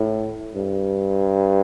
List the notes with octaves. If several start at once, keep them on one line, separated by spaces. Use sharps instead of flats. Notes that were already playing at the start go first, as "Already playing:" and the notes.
Already playing: A2
G2